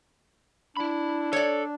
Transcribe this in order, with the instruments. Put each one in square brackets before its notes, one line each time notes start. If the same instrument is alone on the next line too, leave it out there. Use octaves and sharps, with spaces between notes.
[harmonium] D4 [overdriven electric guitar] E4 B5
[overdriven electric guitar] A4 [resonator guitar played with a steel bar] C#5 D5